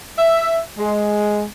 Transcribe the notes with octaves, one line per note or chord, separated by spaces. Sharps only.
E5
G#3